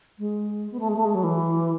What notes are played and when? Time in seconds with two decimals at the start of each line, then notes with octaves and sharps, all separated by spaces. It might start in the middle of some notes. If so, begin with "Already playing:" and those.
0.19 G#3
0.71 B3
0.80 A3
0.89 G#3
0.97 A3
1.05 G#3
1.14 F#3
1.23 E3